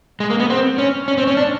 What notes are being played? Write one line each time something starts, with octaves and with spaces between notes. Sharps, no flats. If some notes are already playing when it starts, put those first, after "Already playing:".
G#3
A#3
B3
C4
C#4
C#4
C4
C#4
D4